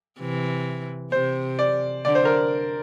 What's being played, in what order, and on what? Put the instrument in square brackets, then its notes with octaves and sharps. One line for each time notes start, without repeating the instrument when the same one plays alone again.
[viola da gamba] C3 E3
[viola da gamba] C3 [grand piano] C5
[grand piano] D5
[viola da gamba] D3 [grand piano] D5
[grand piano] C5
A#4